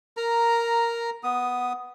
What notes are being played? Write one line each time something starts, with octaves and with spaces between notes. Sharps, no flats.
A#4 A#5
B3 D#6